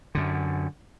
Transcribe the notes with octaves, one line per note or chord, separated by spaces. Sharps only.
F#2 D3